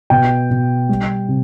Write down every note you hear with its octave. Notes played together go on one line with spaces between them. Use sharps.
B2 G5
B2
G3
C3